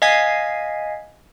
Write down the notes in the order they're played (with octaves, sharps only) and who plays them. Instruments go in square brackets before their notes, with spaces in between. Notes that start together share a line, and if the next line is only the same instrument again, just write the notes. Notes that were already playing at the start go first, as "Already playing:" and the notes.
[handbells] D#5 F5 G#5 G#6 B6 C7